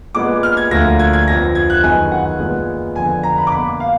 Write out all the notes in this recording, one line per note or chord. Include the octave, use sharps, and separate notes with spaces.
A#2 G#3 B3 D6
F6
G#6
D2 D3 F3 A#3 A#6
G#6
G#6
F2 F3 B3 A#6
G#6
F#6
F#2 D#3 G#3 B3 G#5
F#5
A#2 G#3 B3
F2 D3 F3 B3 G#5
A#5
B5
D6
B2 A#3 B5
F5